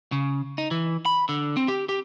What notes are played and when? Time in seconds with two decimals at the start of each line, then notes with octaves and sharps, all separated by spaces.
0.12 C#3
0.58 D#4
0.71 E3
1.06 B5
1.29 D3
1.57 C4
1.68 G4
1.89 G4